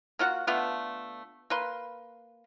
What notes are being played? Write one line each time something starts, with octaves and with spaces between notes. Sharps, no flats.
A#3 F4 F#4 F#5
D3 A3 B3 F4
A#3 B4 C6